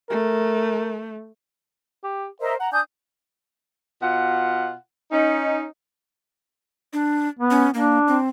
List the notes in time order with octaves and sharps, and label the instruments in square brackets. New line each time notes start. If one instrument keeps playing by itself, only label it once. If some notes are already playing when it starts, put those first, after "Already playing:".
[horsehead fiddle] A3 [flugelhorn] A#4
[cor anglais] G4
[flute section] A#4 D#5 E5 [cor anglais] C5
[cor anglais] F#5 [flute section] A#5
[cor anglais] D4 [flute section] G#5 D#6 G6
[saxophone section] B2 F4 F#5
C#4 D#4
[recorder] D4
[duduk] B3
[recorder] C#4
[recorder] A#3 [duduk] D4
[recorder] C4